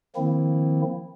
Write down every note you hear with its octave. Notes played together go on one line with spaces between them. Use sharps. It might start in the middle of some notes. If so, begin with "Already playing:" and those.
D#3 F3 A#3 C4 E4